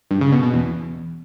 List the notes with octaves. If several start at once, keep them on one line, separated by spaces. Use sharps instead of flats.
G2
C#3
B2
B2
E2